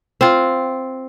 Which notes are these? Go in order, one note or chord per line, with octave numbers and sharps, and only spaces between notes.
C4 F4